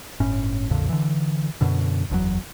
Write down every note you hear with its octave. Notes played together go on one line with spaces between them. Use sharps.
G1 A2 C#4
B1 F2 A#2 D3
D3 E3
F#2 B2 D3
F#1 E2 C3 F#3